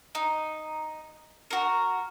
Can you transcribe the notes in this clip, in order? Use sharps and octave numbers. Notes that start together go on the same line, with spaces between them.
D#4
F#4 A#4